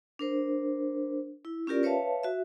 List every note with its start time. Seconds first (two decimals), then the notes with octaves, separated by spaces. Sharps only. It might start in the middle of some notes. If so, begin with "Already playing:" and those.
0.19 D4 A#4 C5
1.45 E4
1.67 C#4 F4 G4 A#4 D5
1.83 B4 C#5 E5 F5 A5
2.23 F#4 E5